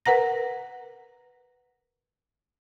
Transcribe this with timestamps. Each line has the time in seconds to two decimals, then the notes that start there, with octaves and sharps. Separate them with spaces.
0.06 A#4 B4 F#5 A#5 A#6